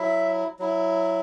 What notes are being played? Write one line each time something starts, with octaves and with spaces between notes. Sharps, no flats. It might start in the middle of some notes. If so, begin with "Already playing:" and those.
Already playing: F#3 E4 E5
F#3 E4